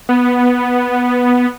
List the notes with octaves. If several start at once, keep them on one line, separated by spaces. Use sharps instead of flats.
B3